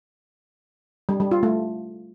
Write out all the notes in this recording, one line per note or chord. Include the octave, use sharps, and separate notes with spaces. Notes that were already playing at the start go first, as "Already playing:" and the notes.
G3
G3
F4
A3